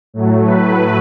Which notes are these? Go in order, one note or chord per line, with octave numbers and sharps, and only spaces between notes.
A2 F#3 A3
B4